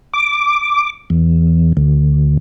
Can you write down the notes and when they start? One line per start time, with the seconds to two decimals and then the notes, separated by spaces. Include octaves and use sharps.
0.14 D6
1.10 E2
1.77 D2